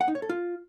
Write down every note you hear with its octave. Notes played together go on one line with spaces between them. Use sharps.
F#5
D#4
C#5
A4
F4